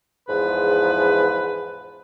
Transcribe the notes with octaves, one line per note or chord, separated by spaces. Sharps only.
E2 G#2 F3 B4